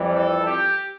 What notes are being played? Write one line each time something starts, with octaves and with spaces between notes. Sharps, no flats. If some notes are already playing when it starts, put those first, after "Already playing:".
Already playing: F2 E3 G3
A4
G4